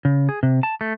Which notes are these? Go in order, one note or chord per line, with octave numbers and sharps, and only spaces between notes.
C#3
G#4
C3
A5
A3